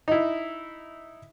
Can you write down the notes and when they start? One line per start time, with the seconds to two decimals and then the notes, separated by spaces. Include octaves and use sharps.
0.08 D#4 E4